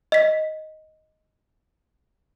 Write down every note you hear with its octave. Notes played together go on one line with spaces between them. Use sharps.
D#5 B6